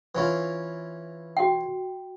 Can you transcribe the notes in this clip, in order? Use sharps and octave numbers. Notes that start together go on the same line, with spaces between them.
E3 C#4 F4
F#4 G5